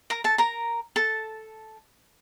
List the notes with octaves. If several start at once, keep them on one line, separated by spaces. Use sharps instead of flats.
A#4 A#5
A4 A5
A#4 A#5
A4 A5